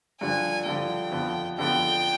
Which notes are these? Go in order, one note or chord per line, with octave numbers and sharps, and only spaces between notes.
G2 D3 F3 G#5
G2 D3 F3 G5
F2 D3 F3 B3
F2 D3 F3 B3 G5